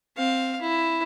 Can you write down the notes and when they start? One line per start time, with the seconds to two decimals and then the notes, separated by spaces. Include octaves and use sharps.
0.16 C4 F5
0.61 E4